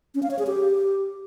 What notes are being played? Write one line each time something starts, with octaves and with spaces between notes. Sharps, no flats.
C#4
F5
C#5
G#4
G4